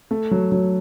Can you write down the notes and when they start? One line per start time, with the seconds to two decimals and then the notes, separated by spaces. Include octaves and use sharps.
0.11 A3
0.31 F#3
0.52 F#3